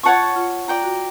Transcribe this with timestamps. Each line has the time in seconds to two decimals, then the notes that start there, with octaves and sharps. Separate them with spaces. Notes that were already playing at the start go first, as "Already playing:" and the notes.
0.03 F4 C#5 F#5 A5 C#6
0.36 F4
0.68 F4 D5 G5 A#5
0.83 F#4